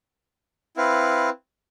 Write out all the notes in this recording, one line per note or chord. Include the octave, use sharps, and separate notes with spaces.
C4 E4 B4 F5